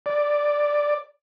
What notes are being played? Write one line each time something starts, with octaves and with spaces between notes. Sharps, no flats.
D5